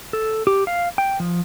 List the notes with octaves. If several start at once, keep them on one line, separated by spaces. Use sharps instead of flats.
A4
G4
F5
G5
F3